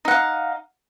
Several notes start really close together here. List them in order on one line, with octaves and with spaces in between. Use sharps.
D#4 F#5 F5